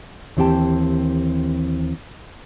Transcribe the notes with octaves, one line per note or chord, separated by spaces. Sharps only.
D#2 E3 C4 G4 G5 A5